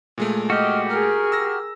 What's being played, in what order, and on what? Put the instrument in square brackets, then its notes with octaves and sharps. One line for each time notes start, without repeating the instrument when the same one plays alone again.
[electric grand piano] A#2 G#3 A3
[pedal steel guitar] F#4 G4 [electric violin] D#5 [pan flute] F6
[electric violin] G#4 A#4 [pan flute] F6
[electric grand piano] E6 A#6